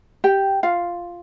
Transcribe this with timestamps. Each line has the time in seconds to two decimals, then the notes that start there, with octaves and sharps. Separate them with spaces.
0.24 G4 G5
0.63 F4 F5